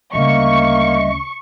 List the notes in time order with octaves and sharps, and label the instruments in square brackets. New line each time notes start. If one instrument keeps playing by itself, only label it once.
[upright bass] D2 C#3 [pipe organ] G3 D#5 E5 [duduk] A#3 [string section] C#6